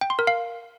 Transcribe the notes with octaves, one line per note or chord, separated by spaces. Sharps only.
G5
C6
A#4
F5